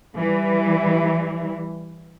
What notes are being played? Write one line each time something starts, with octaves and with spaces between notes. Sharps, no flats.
E3 G3